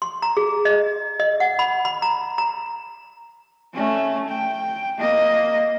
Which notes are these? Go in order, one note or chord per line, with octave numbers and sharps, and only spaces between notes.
C6
A#5
G#4
D#5
D#5
F#5
B5
B5
A#5
A#5
A3 C#4
G5
A#3 D#5